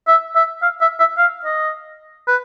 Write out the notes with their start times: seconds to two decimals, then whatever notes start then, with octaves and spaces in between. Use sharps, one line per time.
0.08 E5
0.35 E5
0.62 F5
0.81 E5
1.00 E5
1.18 F5
1.45 D#5
2.28 B4